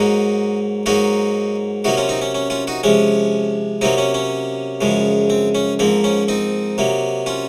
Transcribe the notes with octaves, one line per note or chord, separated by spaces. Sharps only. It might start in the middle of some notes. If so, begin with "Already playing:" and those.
Already playing: G#2 F#3 A#3 D#4 F#4
G#2 F#3 A#3 D#4 F#4
C3 F#3 A#3 D#4 F#4
C#4 F4
C4 D#4
C#4
C#4
C#4 F4
D#4 F#4
C3 F3 G#3 C#4
C3 F#3 A#3 C4 D#4
C#4
C#4
F#2 C#3 F3 G#3
C4
C#4
G#2 F3 A#3 C4
C#4
C4 D#4
C3 F#3 A#3
C#4 F4